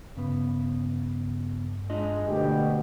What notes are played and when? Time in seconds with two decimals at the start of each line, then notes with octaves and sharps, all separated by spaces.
0.17 G2 C#3 B3
1.90 G#3 D4 F4 D#5
2.28 D2 B2 G4